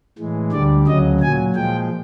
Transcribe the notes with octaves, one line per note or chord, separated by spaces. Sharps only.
A2 E3 G#3
D2 D3 G3 D5
D2 C#3 F#3 D#5
A#2 F#3 G#5
A#2 F3 G#3 G5